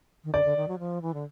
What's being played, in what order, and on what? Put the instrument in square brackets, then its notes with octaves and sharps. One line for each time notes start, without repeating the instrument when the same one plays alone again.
[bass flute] D#3
[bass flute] D3 [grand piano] D5
[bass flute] D3
D#3
F#3
F3
E3
D3